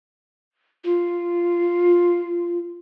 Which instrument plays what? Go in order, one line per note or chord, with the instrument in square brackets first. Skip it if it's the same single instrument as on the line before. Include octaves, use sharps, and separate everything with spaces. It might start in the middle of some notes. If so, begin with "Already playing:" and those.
[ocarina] F4